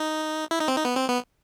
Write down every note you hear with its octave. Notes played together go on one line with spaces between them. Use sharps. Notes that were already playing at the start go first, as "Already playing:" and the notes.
Already playing: D#4
E4
D#4
C4
D#4
B3
C4
B3